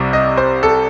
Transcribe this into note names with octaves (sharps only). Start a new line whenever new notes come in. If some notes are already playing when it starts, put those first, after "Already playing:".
Already playing: C2 C3 G3
D#5
C5
A4